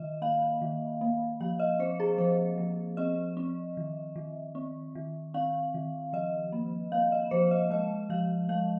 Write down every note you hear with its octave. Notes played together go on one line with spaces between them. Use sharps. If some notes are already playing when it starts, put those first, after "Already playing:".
Already playing: D#3 D#5
A#3 F5
D#3
A#3
F3 F5
D#5
C4 C5
G#4
F3 C5
F3
C4 D#5
C4
D#3
D#3
C4
D#3
C4 F5
D#3
F3 D#5
A#3
A#3 F5
D#5
F3 C5
D#5
G#3 D#5
F3 F5
G#3 F5